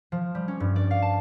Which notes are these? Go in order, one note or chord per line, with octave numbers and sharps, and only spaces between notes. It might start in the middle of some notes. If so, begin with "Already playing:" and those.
F3
G3
C#4
G2
D5
F5
A5